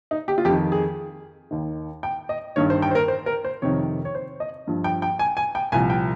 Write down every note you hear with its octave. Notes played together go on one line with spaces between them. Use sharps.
D#4
G4
F4
F2 G4
D#3
G#4
D#2 D#3
G5
D#5
G2 D#3 C#5
C5
G5
C5
A#4
C5
A#4
C5
F2 C3 D#3 C#5
C#5
C5
D#5
G2 F3
G5
G5
G#5
G#5
G5
C2 A#2 F3 G#5
G5